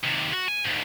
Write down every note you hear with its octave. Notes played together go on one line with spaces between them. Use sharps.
D#2 C3
F#4
G#5
D2 G#2